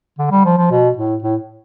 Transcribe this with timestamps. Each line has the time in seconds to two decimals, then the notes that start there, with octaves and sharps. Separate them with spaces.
0.18 D3
0.31 G3
0.45 F3
0.58 F3
0.71 B2
0.97 A2
1.23 A2